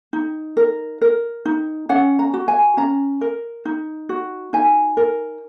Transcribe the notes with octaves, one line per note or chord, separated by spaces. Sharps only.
D#4
A#4
A#4
D#4
C#4 F#5
A#5
F#4
G#5
C#4 A#5
A#4
D#4
F#4
D#4 G#5
A#4